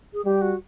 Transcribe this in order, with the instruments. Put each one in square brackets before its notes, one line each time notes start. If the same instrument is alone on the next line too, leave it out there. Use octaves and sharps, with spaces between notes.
[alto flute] G#4
[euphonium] G3 [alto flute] G4
[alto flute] F#4